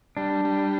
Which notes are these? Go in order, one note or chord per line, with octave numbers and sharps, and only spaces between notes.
G3 D4
G3